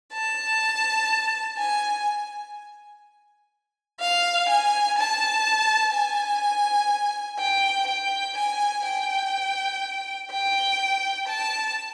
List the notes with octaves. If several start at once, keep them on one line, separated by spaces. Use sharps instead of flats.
A5
G#5
F5
G#5
A5
G#5
G5
G5
G#5
G5
G5
A5